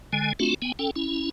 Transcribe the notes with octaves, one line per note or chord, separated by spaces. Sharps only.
D3 G#3 G#5
A3 C4 D4 F4 F#4
B3 G5 G#5
C#4 A4 G5
C#4 E4